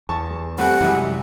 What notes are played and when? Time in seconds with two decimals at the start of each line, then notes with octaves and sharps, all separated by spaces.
0.09 E2 A5 C#6
0.31 G#4
0.58 G3 A3 C4 G4 F#5 G#5
0.81 F#2 C3 E3 G3 G#3